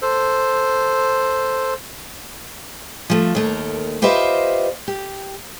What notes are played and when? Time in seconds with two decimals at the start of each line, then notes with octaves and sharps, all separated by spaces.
0.02 A4 C5
3.10 F3 A3
3.35 D#2 A3 A#4
4.02 F4 G4 B4 C5 D#5 E5
4.88 G4